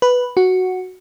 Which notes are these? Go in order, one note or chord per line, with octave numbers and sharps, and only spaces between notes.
B4
F#4